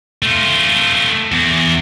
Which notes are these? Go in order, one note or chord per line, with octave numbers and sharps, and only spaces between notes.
A3 F4
E2